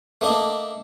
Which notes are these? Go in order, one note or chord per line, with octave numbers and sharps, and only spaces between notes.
A3 A#3 D4 D#5